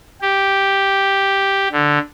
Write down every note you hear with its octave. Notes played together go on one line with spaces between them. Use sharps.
G4
D3